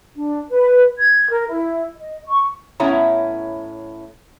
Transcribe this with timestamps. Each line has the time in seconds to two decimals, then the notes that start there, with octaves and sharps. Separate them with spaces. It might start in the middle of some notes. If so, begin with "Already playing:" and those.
0.16 D4
0.50 B4
0.98 G#6
1.30 A#4
1.49 E4
1.96 D#5
2.26 C#6
2.80 A2 B3 C#4 E4 C#5 A#5